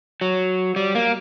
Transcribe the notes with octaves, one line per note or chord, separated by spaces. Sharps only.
F#3
G3
A#3